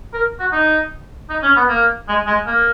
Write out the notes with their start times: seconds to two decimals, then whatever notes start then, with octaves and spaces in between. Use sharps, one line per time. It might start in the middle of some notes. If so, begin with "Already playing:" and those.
0.13 A#4
0.40 F#4
0.52 D#4
1.30 D#4
1.43 C#4
1.56 B3
1.69 A#3
2.08 G#3
2.27 G#3
2.46 A#3